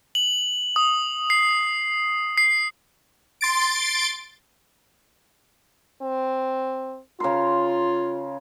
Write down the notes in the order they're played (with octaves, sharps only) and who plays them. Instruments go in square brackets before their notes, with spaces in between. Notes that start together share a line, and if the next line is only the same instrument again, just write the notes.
[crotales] F#7
D#6
C7
C7
[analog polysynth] C6 A6 D7
[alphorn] C4
[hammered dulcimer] C#3 A#4 C6 [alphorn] F4